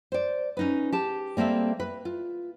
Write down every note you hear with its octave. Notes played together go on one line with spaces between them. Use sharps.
C5 D5
C#4 D#4 B4
G4 A5
G3 A#3 C4 A4 E5
B4
F4